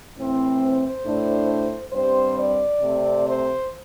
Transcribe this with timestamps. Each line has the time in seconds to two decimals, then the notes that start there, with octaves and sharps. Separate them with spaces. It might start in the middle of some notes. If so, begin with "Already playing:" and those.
0.16 A2 E3 C4
0.61 C5
1.05 A2 A3 D4
1.93 G2 G3 C4 C5
2.37 D5
2.82 C3 A3 C4
3.26 C5